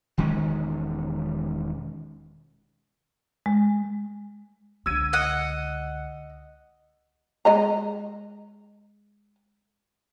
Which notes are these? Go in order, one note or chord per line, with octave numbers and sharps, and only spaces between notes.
E1 D#3 G#3 C#4
G#3
C#2 D3 E6 G#6 D#7
D#5 F#5
G#3 D#5 A#5